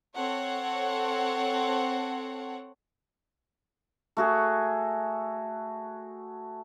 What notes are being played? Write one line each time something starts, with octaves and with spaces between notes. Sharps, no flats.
C4 A4 C#5 F#5
A3 F#4 G#4